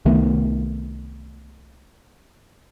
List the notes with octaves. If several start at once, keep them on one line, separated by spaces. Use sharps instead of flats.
C2 D#3 A3 B3